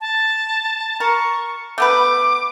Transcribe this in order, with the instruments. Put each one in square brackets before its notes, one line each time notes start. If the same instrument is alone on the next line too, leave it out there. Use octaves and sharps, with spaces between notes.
[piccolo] A5
[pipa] A#4 [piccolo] C#6
[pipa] A3 B3 B4 [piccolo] D6